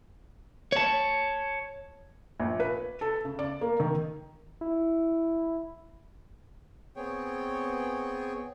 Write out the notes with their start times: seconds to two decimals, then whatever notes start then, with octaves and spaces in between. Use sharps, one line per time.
0.72 C#5 A5
2.40 A#1
2.60 B4
3.01 A4
3.25 C#3
3.39 D5
3.61 A#3
3.80 D#3
4.61 E4
6.95 B3 C4 G#4 C#5 G5